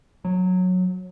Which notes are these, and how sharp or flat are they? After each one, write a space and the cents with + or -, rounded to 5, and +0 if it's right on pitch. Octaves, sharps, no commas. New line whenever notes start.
F#3 -15